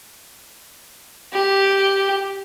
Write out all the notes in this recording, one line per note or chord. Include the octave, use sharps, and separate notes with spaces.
G4